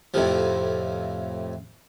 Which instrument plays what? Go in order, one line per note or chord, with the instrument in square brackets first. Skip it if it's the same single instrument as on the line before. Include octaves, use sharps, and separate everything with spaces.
[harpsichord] F2 A2 C3 F3